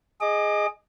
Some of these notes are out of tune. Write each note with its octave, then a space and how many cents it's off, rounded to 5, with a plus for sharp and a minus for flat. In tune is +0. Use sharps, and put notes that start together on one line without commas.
G#4 +0 D#5 +0 D6 +30